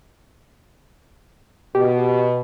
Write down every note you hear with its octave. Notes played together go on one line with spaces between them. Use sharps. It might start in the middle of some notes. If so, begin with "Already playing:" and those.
B2 G4